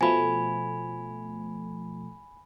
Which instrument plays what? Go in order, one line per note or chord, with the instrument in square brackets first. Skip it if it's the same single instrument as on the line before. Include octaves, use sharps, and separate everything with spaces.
[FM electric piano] B2 F3 A3 [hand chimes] G#5 B5